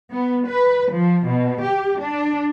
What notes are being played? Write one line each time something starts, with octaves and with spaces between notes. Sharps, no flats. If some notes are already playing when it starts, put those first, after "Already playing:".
B3
B4
F3
B2
G4
D4